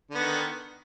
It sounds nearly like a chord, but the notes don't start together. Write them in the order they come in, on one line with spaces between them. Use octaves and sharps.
D3 B3 D#3